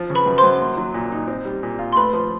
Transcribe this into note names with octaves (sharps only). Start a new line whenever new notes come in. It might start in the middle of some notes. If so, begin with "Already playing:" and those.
Already playing: F3
C#3
B4 B5
F#2
C5 C6
F#2
A#3
F#3
A#2
D#4
C4
G3
A#2
F4
C6
A3 B4 B5
F3